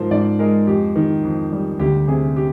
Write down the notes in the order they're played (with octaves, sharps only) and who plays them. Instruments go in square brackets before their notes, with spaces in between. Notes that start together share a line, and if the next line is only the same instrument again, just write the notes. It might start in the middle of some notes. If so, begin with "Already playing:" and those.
Already playing: [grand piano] G#2 F3 A#4 C5
G#2 D5
G#3 A#4
F2 G4
D#3
F2
G3
D2 G4
C3 G#4
G4